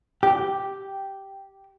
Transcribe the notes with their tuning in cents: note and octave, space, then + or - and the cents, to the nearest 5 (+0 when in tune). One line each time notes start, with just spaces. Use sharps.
G4 -5